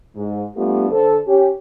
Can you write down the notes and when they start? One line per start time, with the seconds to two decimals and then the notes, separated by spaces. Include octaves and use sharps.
0.15 G#2
0.56 G3 A3 B3 D4 F4 G4
0.90 D3 A4 C5
1.27 C#4 G4